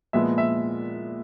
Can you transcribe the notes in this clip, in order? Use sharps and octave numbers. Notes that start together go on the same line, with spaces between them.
A#2 F3 G#3 B3 E5
E5